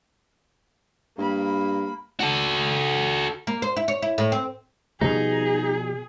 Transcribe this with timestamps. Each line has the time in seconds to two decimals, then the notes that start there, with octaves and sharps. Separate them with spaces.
1.18 G2 A#3 B5
2.20 F#4 A4
3.47 A#3
3.62 C5
3.76 E4
3.88 C#5
4.02 E4
4.18 A2
4.32 C4
5.01 B2 F3 G3 D#4 G#4